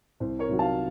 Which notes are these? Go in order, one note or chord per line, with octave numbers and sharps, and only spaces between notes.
C2 C5
A#4 C#5
C3 D#3 F#3
F5 A5